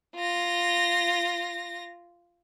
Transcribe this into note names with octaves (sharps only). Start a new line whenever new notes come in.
F4 A#6